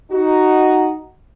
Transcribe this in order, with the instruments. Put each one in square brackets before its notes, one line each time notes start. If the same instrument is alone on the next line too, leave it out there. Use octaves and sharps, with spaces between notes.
[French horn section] D#4 F#4